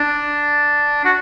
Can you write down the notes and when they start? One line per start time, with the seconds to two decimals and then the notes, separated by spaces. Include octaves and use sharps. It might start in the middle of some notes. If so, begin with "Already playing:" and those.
Already playing: D4
1.05 F#4